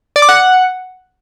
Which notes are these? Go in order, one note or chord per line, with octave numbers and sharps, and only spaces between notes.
D5
D6
F#5